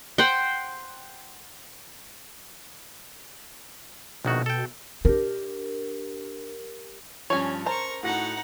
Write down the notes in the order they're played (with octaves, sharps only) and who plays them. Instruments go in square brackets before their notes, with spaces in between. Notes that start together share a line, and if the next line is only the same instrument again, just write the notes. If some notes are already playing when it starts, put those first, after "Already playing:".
[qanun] C5 F#5 G5
[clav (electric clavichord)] A#1 D#3 F#4 [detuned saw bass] B2
[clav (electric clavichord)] A4 G5
[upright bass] D4 [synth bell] G4 A#4
[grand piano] G2 F3 [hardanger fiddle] C#4 [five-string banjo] C#5 G#5
[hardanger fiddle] A#4 C#6 [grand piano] C5 [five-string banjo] A5 A#5
[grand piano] A2 F#4 A#6 [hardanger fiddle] D#4 F#5